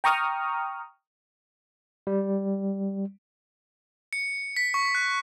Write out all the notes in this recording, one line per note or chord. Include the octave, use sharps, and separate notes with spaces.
G5 A#5 C#6 D#6 F6
G3
C#7
B6
C#6
F#6